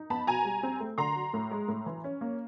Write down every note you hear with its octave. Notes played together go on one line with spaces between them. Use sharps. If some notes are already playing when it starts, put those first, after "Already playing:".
Already playing: D#4
B3 A5 B5
B2 G#5 A#5
G3
C4
A3
D3 A#5 C6
F#3
A2
G#3
A2
E3
C#4
A#3